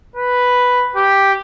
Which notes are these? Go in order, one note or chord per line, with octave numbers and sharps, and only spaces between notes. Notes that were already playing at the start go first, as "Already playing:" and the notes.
B4
G4